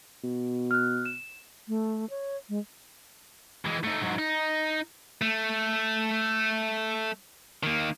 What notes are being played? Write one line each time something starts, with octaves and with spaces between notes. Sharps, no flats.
B2
F6 F#6
E7
A3
C#5
G#3
E3 G#3
A3 D#4
G#2 F#3
D#4
A3
D#3 A#3